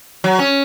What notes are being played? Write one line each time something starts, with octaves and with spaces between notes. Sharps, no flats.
F#3
C#4